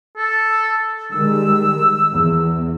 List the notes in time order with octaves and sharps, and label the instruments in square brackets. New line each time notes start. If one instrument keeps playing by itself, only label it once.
[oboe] A4
[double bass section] D#3 G3 G#3 [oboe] E6
[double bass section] E2